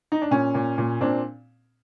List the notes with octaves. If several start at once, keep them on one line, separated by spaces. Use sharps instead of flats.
D#4
D4
A#2 C#4
A#2
A#2
A#2 C4 D4